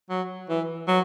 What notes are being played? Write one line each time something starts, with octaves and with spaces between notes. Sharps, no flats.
F#3
E3
F#3